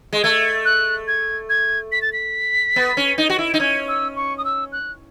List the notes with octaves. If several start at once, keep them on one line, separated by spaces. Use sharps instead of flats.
G#3
A3 G#6
F#6
G#6
G#6
B6
A6
B6
B3
C#4
D#4
F#4
E4
D#4
C#4 G#6
E6
C#6
D#6
E6
F#6